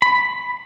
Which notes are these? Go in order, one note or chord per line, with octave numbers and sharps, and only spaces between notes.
B5